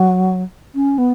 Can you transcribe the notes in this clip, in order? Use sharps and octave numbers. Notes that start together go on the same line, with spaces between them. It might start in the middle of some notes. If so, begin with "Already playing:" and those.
Already playing: F#3
C#4
B3